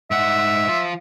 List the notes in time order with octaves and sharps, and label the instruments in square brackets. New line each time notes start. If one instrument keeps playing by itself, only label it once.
[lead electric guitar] G#2 F#5 [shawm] E5
[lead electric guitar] F3 F4